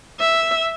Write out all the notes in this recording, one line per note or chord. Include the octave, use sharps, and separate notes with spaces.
E5